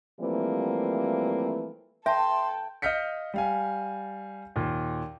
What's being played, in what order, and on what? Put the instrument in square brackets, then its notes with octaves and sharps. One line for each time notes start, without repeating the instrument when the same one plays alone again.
[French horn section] E3 F3 G3 A3 A#3 C4
[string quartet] A4 [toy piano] E5 A5 [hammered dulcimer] G5 [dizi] C6
[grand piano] D#5 F5 F6 G6 B6 C#7
G3 F5 G#5
D#2 A#2